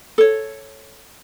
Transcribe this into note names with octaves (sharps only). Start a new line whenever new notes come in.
A4 C#5